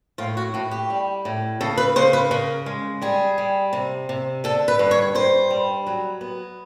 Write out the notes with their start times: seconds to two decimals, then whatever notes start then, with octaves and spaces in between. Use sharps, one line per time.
0.18 A2 F4
0.37 F#4
0.54 A2 F#4
0.71 G4
0.90 G3
1.25 A2
1.61 C#3 A4
1.77 B4
1.96 C#3 C5
2.13 B4
2.31 C#3 A#4
2.66 G#3
3.02 G3 G#4
3.38 G3
3.73 C3
4.09 C3
4.44 D3 A4
4.68 B4
4.79 G2
4.91 C#5
5.15 G2 C5
5.50 G3
5.87 F#3
6.21 B3